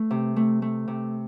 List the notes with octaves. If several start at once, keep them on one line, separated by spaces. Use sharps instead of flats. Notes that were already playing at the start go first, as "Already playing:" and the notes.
Already playing: A3
C3
A3
A3
C3